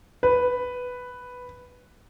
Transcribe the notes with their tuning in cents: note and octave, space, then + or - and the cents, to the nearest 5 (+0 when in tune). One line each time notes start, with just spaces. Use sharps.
B4 +5